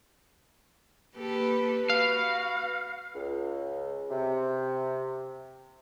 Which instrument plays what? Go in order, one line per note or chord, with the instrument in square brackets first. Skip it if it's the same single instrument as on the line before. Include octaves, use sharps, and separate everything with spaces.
[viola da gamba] A#3 G4 A4 [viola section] B4
[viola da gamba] F#4 [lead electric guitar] F5
[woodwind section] C#2
C3